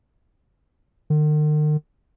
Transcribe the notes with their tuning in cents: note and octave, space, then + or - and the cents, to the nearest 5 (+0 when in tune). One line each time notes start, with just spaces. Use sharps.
D#3 -45